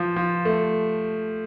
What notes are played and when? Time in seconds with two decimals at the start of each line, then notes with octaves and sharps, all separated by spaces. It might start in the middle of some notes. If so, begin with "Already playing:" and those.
Already playing: F3
0.16 F3
0.45 A3